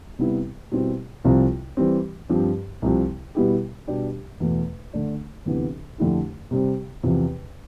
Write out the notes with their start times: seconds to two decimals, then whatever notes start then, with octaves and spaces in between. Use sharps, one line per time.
0.19 C3 G3 B3 E4
0.72 B2 G3 C4 E4
1.24 C2 C3 F3 C4 F4
1.77 E3 G3 C4
2.29 G2 F3 C4 G4
2.82 C2 C3 F3
3.35 B2 G3 B3 E4 G4
3.88 B2 G3 D4 G4
4.40 E2 B2 A3
4.93 D3 A3 D4
5.46 D2 C3 E3 B3
5.98 F2 D3 A3 E4 G4
6.51 C3 G3 C4
7.03 E2 C3 F3